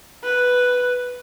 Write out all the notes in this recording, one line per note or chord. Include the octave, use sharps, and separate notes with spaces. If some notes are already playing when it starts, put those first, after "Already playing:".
B4